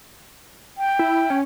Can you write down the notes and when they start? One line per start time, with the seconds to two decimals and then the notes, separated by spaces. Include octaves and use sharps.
0.78 G5
0.99 E4
1.30 C#4